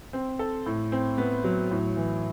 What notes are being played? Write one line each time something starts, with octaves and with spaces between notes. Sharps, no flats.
C4
A4
A2
C4
B3
F#3
A2
E3